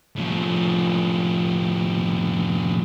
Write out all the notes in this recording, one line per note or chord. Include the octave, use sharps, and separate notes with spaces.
A2 F3